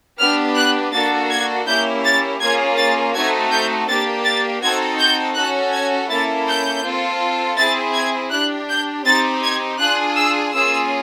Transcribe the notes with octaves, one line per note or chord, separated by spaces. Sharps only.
B3 D4 G4 F6
F#6
A#3 D4 F#4 A4 A6
G#6
A#3 C#4 E4 G4 G6
A6
A#3 C#4 F4 G#4 G#6
A6
A3 C4 D#4 F#4 A4 G#6
G6
A#3 D4 G4 A6
A6
C4 D#4 F#4 A4 G#6
G6
C#4 F#4 A4 F#6
G#6
A#3 C#4 E4 A4 A6
G6
C4 F4 A4
C4 E4 G#4 A6
G#6
D4 G4 F#6
G6
C4 D#4 G4 A6
G#6
D4 F4 G#4 F#6
E6
A#3 C#4 F4 G#4 E6